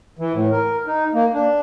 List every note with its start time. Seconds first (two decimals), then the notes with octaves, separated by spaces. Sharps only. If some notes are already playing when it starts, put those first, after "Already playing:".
0.19 E3
0.34 A2
0.51 A#4
0.86 D#4
1.14 A#3
1.34 D4